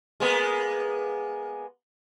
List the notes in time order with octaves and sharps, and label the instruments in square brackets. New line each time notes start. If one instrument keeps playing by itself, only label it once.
[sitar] G#3 A#3 B3